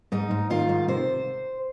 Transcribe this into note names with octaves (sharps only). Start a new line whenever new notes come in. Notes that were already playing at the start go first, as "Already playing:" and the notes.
G#2 D#4
G#2
D#3 F4
G#2
C3 C5